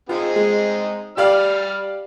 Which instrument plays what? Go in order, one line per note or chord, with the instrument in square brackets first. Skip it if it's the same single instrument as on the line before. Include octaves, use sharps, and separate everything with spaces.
[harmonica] C4 D#4 G#4 [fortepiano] F4
[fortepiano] G#3
[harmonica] G3 F6 [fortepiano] G4 D5 F5